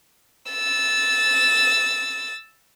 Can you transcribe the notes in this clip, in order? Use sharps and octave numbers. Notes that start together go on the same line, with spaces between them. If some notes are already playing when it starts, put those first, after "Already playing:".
E6 A6